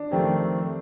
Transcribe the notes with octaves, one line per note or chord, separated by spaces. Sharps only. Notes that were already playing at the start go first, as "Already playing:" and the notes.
Already playing: D4
F2 D#3 A3 C4 G4